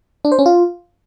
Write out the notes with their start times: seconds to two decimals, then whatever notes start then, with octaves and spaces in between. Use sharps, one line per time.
0.25 D4
0.32 C5
0.39 C#4
0.46 F4